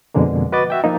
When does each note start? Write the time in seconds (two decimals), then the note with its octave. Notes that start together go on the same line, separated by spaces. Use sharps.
0.14 F2 B2 D3 G#3 A#3
0.52 F#4 B4 D#5 D6 A6
0.70 F#4 E5 G5
0.84 F3 A#3 D#4